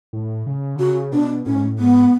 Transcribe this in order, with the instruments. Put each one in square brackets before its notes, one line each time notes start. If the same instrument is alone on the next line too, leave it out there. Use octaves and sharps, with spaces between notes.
[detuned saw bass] A2
C#3
D3
[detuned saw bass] C#3 [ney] F#4
[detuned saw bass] B2 [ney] D4
[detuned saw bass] A2 [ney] C#4
[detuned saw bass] G#2
A2
[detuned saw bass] G#2 [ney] B3